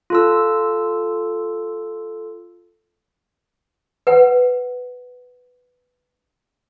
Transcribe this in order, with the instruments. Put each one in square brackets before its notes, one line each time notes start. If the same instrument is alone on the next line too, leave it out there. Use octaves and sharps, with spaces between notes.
[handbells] F4 A4 E6
[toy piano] B4 F#5